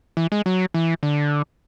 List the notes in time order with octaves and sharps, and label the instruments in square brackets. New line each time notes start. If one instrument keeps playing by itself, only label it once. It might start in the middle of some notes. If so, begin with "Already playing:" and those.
[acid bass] E3
G#3
F#3
E3
D3